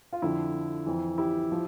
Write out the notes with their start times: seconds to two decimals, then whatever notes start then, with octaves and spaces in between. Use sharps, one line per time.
0.13 F4
0.22 F2 D3 F3 E4
0.86 F2 E3
1.18 E4 G4
1.52 F3